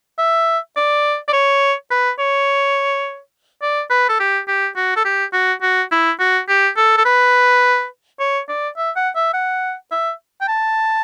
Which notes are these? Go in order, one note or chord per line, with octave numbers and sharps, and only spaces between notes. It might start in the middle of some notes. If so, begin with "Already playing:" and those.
E5
D5
D5
C#5
B4
C#5
D5
B4
A4
G4
G4
F#4
A4
G4
F#4
F#4
E4
F#4
G4
A4
A4
B4
C#5
D5
E5
F#5
E5
F#5
E5
G5
A5